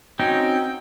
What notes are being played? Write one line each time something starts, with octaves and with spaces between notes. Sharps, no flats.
C4 C#4 D#4 F#4 G5